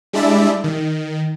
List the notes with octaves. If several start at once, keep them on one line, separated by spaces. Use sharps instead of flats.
G3 G#3 D4 E4 D5 E5
D#3